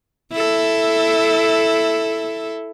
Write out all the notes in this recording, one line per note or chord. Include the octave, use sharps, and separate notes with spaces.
E4 A4